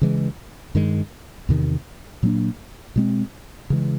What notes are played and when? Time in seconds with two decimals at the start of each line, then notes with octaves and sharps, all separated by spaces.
0.02 C#3 E3 G#3
0.75 G2 D#3 G#3
1.49 E2 C3 D#3
2.23 A#2 F#3 A#3 D4
2.96 B2 G#3 C4
3.70 C#3 E3 G#3